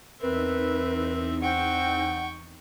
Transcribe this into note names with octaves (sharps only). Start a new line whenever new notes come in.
E2 C4 D#4 A#4 B4 E5
C4 F#5 G5 C#6